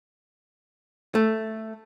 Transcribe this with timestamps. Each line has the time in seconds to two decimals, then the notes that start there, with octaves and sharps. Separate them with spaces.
1.15 A3